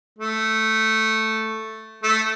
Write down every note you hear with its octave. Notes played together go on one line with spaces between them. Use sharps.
A3
A3